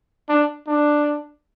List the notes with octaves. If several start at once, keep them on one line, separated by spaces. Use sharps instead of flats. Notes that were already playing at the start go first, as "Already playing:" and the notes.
D4
D4